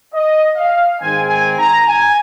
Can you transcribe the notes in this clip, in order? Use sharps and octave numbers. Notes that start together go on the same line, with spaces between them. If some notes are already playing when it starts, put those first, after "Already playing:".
D#5
F5
G#2 D#3 C4 G#5
G#5
A#5
G#5